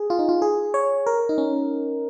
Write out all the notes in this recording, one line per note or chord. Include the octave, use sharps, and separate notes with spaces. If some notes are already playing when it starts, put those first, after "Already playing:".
Already playing: G#4
F4
D#4
F4
G#4
C#5
A#4
D#4
C#4